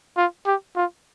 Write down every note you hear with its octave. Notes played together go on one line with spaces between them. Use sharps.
F4
G4
F4